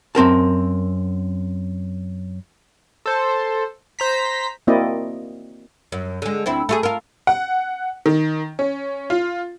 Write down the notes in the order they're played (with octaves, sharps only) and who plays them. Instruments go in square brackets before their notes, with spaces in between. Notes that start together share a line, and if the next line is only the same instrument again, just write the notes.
[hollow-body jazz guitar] F#2 C4 A#4 A5
[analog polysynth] A4 C5
C5 A#5 B6
[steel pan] A#3 C4 E4 F#4 D5 D#5
[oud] F#2
D3 G#3
D2 C4 E4
A3 F4 G#4
F4 A#4
[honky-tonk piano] F#5
D#3
C#4
F4